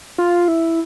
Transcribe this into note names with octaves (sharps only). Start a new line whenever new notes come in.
F4
E4